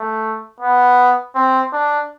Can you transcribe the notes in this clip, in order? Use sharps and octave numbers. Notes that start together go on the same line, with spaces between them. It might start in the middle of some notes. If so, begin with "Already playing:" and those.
Already playing: A3
B3
C4
D4